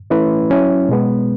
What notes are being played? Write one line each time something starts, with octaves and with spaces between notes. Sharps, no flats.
E3 A3 C#4 E4 B4
F#3 C#4 E4
B2 G#3 B3